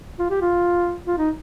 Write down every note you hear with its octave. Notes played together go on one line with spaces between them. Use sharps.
F4
G4
F4
F4
D#4